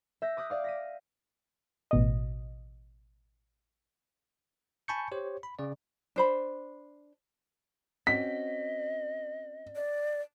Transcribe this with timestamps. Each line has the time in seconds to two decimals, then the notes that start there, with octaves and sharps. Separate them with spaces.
0.22 E5 G6 A#6
0.37 D6 D#6 F#6 G6 B6
0.50 D5 F5 D6
0.64 A#6 B6 D#7
1.91 A1 B2 D#5
4.88 G#5 A5 B5 C#6 G6 C#7
5.12 G4 C5 C#5
5.43 B5
5.59 C#3 D5
6.16 D4 C5 B5
8.07 C4 C#4 F#4 D#5 B6
9.76 D5